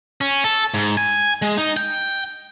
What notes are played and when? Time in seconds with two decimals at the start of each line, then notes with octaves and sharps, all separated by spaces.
0.21 C#4
0.44 A4
0.74 G#2
0.97 G#5
1.42 G#3
1.57 D#4
1.77 G5